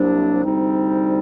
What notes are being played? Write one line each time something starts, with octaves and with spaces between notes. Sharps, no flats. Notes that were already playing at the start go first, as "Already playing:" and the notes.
Already playing: C2 C3 F#3 A#3 D4
D2 C3 G3 C4 D#4